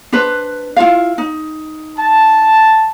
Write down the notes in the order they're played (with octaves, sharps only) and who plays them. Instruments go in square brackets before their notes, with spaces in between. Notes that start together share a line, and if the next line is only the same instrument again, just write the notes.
[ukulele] D4 B4 C5
E4 F4 F5
D#4
[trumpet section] A5